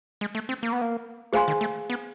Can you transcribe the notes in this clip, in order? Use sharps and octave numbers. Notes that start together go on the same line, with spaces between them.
G#3
A3
C4
A#3
B3
A#3
A3 G#4 C5 F5 G#5 C6
D#3
A3
B3